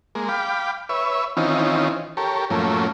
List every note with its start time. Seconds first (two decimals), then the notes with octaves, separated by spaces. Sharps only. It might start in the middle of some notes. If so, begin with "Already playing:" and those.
0.15 G#3 A#3
0.29 F5 G5 B5 D6
0.89 B4 C#5 E5
1.37 D#3 E3 C4 C#4 D#4 F4
2.17 G4 A4 A#4 C#5
2.50 F#2 A2 F3 A3 A#3 C#4